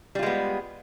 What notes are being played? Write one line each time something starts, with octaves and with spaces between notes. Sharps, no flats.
G3 G#3 B3 F4